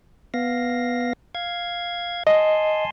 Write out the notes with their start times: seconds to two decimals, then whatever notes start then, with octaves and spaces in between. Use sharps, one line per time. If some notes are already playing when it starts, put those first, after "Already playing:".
0.34 B3 F5 A#6
1.35 F5 G#6
2.27 D#5 G#5 A5 C6